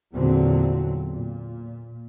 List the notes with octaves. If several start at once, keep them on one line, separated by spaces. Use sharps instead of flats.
E2 A#2 D3 F#3 C4
A#2